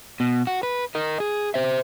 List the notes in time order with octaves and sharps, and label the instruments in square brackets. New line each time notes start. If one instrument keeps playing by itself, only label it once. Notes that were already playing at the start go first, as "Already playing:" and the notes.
[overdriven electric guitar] B2
F#4
B4
A#4 D#5
G#4
C5 E5